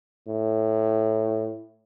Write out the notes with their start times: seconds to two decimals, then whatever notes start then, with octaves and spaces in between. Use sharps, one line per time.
0.28 A2